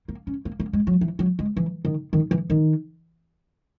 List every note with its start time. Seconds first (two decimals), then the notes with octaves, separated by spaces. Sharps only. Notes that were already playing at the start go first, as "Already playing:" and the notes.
0.08 A#3
0.27 C#4
0.45 A#3
0.60 A#3
0.73 G#3
0.87 F#3
1.01 E3
1.19 F#3
1.39 G#3
1.57 E3
1.85 D#3
2.13 D#3
2.31 E3
2.50 D#3